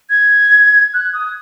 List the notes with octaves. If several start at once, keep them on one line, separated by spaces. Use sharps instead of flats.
G#6
F#6
D#6